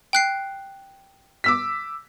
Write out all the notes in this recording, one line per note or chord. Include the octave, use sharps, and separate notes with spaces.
G5 F#6 C7
D6 E6 B6